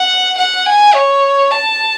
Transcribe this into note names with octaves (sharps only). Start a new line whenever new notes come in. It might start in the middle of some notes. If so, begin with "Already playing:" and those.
Already playing: F#5
F#5
G#5
C#5
A5